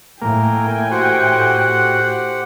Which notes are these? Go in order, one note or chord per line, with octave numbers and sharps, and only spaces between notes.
A2 A#3 G5 G#5
F#4 G4 C5 F#5